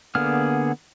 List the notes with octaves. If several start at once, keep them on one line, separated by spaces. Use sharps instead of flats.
D3 A#3 B3 G#4 F6